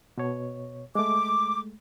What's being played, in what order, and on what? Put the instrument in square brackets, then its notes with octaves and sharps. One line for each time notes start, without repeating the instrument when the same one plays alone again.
[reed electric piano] B2 C#5
[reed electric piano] G#3 A3 [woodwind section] D6